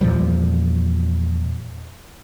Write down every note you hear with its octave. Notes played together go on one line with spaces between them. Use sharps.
E2 A#2 F3 G3